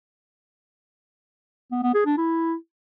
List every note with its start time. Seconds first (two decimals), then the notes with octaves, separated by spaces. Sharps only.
1.71 B3
1.83 B3
1.94 G#4
2.06 D4
2.17 E4